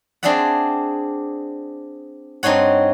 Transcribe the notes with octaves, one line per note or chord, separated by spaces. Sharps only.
C4 D4 G#4 D5 E5 F#5
G2 C4 D#4 C#5 F#5